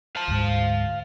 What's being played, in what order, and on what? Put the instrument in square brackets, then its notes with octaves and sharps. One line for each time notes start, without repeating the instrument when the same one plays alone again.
[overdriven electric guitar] F5 A5
[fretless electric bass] D2 G#2